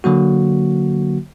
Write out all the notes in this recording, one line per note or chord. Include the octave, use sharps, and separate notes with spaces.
D3 F#3 A#3 F#4